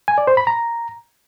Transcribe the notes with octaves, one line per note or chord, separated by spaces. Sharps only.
G#5
D5
C5
B5
A#5